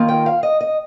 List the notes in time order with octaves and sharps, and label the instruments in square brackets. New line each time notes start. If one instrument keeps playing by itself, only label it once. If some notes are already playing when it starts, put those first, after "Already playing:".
Already playing: [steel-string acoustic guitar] D#3 A#3 F4
G5
F5
D#5
D#5